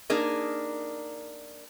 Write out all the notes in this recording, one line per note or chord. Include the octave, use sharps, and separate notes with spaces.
A#3 D4 D#4 G#4 A#4